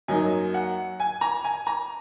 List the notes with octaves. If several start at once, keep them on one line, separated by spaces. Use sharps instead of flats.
F#2 F#3 A#3 D#4 G#5
F#5
G#5
A#5
G#5
A#5